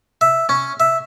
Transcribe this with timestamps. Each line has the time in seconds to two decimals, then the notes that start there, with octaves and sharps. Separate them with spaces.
0.21 E5
0.49 C#4
0.80 E5